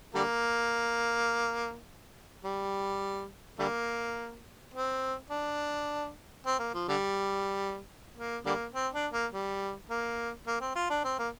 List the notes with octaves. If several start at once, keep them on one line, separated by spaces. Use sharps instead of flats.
D3 G3 A#3
G3
D3 G3 A#3
C4
D4
C4
A#3
F3
D3 G3
A#3
D3 G3 A#3
C4
D4
A#3
G3
A#3
A#3
C4
F4
D4
C4
A#3